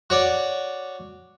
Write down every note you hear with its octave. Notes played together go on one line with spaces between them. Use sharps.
F#4 C#5 D5